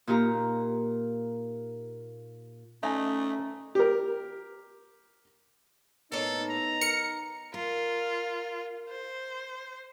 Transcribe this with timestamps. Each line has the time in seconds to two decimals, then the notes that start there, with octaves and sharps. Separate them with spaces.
0.07 A#2 D#4 F4 G4 F5 A#5
2.83 A3 C#4 D#4 E5 G#5
3.75 G4 A#4
6.12 A2 A#3 B3 D#4 A4
6.50 A#5
6.81 A#4 C#7
7.54 F4 A#4
8.89 C5